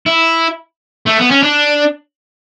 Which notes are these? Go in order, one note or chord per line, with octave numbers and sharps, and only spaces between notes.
E4
A3
B3
C#4
D4